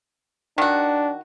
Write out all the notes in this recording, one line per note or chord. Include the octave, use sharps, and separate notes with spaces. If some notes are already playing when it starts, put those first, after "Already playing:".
D#3 D4 F#4